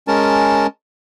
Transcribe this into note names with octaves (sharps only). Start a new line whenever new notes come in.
G#3 C#4 A#4 A5